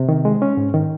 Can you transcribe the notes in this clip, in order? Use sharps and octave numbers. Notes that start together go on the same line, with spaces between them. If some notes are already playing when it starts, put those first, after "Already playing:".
Already playing: C3
D#3
G#3
C#4
G#2
D#3